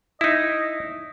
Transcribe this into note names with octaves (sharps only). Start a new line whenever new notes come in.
D#4 E4 D#5